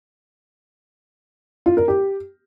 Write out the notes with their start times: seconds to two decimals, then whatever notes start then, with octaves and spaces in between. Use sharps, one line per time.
1.66 F4
1.77 A#4
1.88 G4